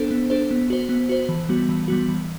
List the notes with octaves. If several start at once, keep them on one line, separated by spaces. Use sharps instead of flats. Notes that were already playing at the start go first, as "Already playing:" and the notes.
Already playing: B3 D4 A4 C5
B3
D4 A4 C5
B3
F#4 C5
B3
F#4 C5
E3
G3 B3 F#4
E3
G3 B3 F#4
E3